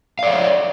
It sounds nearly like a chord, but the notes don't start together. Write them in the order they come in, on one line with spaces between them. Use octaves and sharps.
F5 D5 C#5